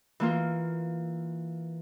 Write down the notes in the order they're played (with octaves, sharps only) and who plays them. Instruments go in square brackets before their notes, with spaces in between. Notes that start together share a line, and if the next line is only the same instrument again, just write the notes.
[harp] E3 A#3 F4